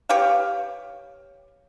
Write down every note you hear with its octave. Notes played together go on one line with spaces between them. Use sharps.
G4 B4 C#5 F5